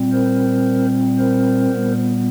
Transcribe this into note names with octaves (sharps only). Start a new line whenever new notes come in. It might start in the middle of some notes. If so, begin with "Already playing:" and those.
Already playing: A#2 G3 C4
A#4 C5
A#4 C5
A#2 G3 B3